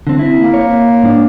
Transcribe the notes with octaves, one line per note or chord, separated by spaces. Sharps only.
D3 C4
E4
A#3
C#5
G#2 D4